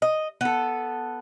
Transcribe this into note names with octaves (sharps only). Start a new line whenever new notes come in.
D#5
B3 A4